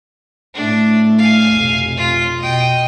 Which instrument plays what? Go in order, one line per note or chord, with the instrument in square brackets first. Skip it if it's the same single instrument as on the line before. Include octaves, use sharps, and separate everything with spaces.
[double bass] A2 A3 [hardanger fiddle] D4
[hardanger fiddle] F5 G#5
[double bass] F1 B1
[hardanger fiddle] F4
[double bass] B2 [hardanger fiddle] D#5 G5